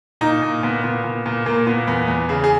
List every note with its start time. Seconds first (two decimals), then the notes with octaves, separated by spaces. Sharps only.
0.21 A#2 D#4
0.42 A#2
0.63 A#2 B3
0.84 A#2 B3
1.04 A#2
1.26 A#2
1.46 A#2 A#3
1.67 A#2 B3
1.87 E2 B3
2.08 E2
2.29 C#3 G#4
2.44 G#4